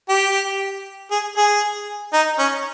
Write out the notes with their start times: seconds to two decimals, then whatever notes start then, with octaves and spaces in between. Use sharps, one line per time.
0.09 G4
1.11 G#4
1.37 G#4
2.13 D#4
2.39 C#4